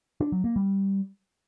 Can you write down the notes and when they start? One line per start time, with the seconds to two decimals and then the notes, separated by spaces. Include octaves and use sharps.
0.20 D4
0.32 F#3
0.44 A#3
0.56 G3